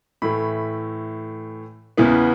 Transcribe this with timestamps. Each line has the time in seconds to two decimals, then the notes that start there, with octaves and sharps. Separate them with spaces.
0.22 A2 E3 A3 B5
1.97 E2 C#3 E3 B3